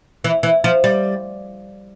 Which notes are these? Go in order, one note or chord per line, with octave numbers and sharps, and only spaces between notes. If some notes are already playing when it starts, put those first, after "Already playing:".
E3
E3
F3
G3